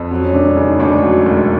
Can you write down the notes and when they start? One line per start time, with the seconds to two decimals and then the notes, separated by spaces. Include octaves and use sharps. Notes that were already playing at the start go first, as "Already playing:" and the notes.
Already playing: F2
0.11 F#3 C4
0.24 C#4
0.33 E1 D4
0.56 C#3 D#4
0.79 D2 D4
1.03 F#3
1.26 E1